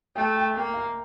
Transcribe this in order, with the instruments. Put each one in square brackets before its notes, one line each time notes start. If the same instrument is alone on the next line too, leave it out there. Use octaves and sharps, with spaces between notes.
[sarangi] A3 [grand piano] G5
[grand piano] G5
[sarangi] A#3 [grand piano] G5
[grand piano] F5